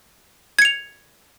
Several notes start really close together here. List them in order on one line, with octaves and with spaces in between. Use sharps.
G#6 C#7 F7